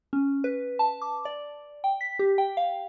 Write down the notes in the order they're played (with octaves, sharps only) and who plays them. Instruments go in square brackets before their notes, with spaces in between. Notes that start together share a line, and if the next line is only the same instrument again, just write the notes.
[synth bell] C#4
B4
A5
D6
D5
G5
B6
G4
G5
F5